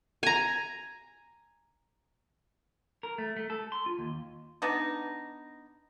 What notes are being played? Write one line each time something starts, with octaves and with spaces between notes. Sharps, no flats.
G#5 A#5
A#4
A3
A3
A4
C6
F4
D#2
B3 D4 D#4